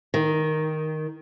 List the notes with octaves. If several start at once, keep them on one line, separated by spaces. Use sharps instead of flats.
D#3